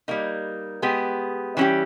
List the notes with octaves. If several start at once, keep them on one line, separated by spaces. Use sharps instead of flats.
G3 A#3 D#4
G#3 B3 G4
E3 G3 C#4 G4